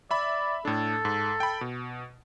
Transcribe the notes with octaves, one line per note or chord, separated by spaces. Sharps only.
D5 E5 B5
A2 D4 A4
G#2
G5 B5
B2